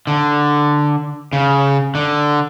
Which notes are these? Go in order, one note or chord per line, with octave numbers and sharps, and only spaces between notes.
D3
C#3
D3